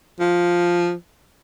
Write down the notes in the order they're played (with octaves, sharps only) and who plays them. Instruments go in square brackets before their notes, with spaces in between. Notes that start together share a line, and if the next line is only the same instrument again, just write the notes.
[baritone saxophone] F3